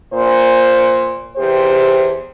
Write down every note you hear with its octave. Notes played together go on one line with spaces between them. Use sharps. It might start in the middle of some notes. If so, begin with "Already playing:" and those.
A#2 C5
E2 G4 C5